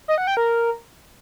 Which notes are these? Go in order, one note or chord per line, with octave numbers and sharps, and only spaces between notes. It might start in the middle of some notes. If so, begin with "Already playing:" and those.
D#5
F#5
G5
A#4